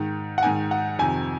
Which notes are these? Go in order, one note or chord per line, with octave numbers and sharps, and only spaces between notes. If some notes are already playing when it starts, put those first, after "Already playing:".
Already playing: G#2 D#3
F#5
G#2 D#3 G#5
F#5
F2 C3 D#3 G#5